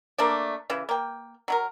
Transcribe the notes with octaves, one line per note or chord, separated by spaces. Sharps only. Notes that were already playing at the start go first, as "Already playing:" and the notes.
A3 A#3 D4 D5
C#3 E3
A#3 G5
F#3 E4 A#4